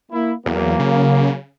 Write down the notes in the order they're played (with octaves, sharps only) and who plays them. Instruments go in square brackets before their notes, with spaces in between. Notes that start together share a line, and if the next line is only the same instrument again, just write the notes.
[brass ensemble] A#3 E4
[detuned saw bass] E2 [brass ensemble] F#3 A#3
[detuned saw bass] C#3